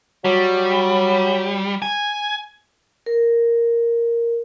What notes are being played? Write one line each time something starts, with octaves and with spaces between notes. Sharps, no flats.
F#3 G3
G#5
A#4